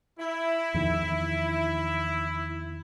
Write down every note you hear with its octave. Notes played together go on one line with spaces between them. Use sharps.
E4
E2 D#3 F3